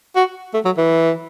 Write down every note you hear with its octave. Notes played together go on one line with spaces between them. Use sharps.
F#4
A3
F#3
E3